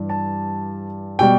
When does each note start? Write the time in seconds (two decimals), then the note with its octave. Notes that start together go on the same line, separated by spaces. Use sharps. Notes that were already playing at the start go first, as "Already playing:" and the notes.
Already playing: G2 E3 G3
0.09 A5
1.19 B2 G3 G5